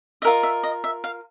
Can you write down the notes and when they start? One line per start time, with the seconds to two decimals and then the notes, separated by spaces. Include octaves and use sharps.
0.22 D#5 E5
0.25 F4 A#4
0.43 E5
0.63 D#5
0.84 E5
1.04 F5